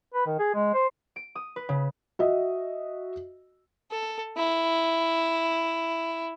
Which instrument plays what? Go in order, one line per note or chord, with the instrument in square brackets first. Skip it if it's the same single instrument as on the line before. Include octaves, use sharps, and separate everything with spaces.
[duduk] B4
D#3
G#4
G#3
C5
[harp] D7
D#6
B4
C#3
[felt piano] F#4 D#5 E5
[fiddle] A4
E4